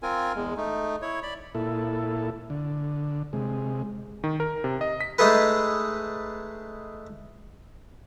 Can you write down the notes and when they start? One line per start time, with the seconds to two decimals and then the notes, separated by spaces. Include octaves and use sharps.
0.03 C4 F4 A#4 G#5
0.36 E2 G#3
0.57 A3 D#4
1.02 E4 C#5
1.23 D5 B5
1.55 A#2 E4 A4
2.50 D3
3.33 C3 G#3
4.24 D#3
4.40 A#4
4.64 C3
4.81 D#5
5.01 B6
5.18 G#3 A3 D#4 G#4 A4 B4